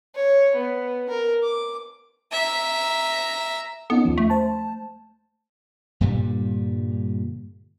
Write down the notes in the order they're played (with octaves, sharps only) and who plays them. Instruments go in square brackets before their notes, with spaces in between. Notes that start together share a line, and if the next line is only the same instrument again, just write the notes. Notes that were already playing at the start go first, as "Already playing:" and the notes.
[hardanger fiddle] C#5
B3
A#4
D6
[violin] E5 A#5
[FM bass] B3 [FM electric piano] C#4 D#4 A4
[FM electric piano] D#2 F3
[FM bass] A3
[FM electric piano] C5 A5
[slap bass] G2 A#2 D3 G3